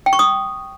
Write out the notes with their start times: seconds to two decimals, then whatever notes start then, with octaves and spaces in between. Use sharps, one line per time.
0.06 G5
0.13 C#6
0.19 D#6